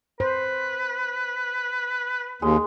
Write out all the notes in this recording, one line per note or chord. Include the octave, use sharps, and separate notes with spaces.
B4 C5
D#2 G#3